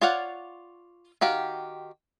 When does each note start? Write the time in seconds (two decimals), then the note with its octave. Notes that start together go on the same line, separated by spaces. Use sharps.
0.01 F4 C#5 D5 F5 F#5
1.21 D#3 F#4 G4 F5